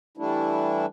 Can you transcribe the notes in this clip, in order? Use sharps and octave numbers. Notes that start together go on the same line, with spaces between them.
E3 G3 A3 D4 E4